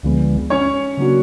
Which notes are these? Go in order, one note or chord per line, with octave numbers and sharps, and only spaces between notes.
D2 D3 F3 G#3 B3
C#4 C#5
C#3 F#3 A#3 D4 F#4